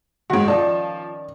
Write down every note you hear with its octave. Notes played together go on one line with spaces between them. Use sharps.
G#2 D#3 C#4 F#4
F3 D#4 D5 A5